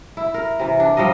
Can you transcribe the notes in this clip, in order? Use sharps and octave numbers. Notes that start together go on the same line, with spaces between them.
E4
A#4
C3 E3
D4
F3 G3 A#4 D#5